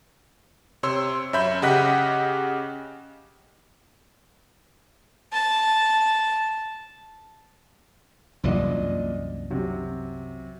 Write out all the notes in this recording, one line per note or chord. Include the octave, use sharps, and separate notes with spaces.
C3 C#5 C6 E6
F#2 C#5 E5 B5 G6
C#3 G4 D#5 F#5 F#6 B6
A5
C2 F#2 A#2 E3 D4 D#5
C3 F#3